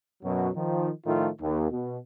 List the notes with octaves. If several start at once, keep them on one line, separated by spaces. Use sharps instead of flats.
F#2 B2 F#3
D#3 F3
A2 D#3 F3 A3 F4
D#2
B2